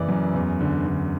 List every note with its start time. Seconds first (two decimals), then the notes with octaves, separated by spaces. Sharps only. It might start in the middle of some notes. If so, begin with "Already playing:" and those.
Already playing: F#1 E3 D5
0.08 F#2
0.34 E2
0.60 D3
0.86 D3